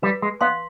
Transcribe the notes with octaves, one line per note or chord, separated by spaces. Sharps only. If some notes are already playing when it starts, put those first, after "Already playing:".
G3 B4
G#3
B3 F5 C6